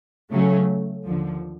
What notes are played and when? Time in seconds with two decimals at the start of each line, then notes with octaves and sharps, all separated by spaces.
0.30 C#3 F#3 A3 C#4
1.03 D#2 D3 F3